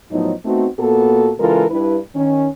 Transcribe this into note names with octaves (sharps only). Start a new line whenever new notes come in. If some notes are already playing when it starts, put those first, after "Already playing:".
A2 F3 F#3 B3 D#4
A3 B3 C4 D#4 F#4
A#2 A#3 B3 F#4 A4
C#3 E3 G#3 F4 A4 A#4
G2 E4 B4
D#3 C#4